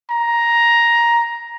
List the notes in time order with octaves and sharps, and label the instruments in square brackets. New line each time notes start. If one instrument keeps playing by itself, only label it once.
[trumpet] A#5